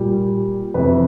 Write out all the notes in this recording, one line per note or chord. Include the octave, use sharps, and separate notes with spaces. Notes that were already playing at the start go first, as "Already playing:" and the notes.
Already playing: A#2 G3
F2 C3 E3 B4